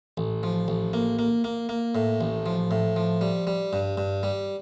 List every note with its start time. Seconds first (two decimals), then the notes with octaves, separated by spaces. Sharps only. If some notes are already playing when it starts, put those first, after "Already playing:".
0.17 A1
0.43 F3
0.68 A1
0.93 A#3
1.19 A#3
1.44 A#3
1.69 A#3
1.95 A2
2.21 A1
2.46 F3
2.71 A2
2.96 F3
3.21 G3
3.47 G3
3.73 G2
3.98 G2
4.23 G3